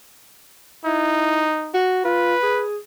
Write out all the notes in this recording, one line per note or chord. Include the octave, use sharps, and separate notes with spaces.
D#4 E4
F#4
F4 B4
G#4